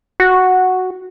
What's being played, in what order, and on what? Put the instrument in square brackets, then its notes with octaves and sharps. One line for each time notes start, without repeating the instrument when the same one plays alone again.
[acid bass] F#4